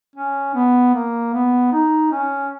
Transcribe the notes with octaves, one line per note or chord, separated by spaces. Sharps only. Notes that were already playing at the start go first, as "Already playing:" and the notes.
C#4
B3
A#3
B3
D#4
C#4